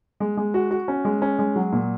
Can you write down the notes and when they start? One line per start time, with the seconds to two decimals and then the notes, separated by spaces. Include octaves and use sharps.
0.20 G#3
0.37 G#3
0.54 F#4
0.71 F#4
0.88 C#4
1.05 G#3
1.22 C#4
1.39 G#3
1.56 F#3
1.72 A#2